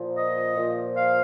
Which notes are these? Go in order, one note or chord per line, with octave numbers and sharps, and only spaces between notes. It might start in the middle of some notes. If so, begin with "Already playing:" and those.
Already playing: A#2 F3
D#5
A#2 F3
F5